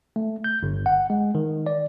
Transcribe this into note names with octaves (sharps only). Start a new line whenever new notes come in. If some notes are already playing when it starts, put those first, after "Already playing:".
A3
G6
G1
F#5
G#3
D#3
D5